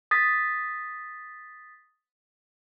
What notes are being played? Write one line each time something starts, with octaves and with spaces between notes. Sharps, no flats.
D#6 A6 B6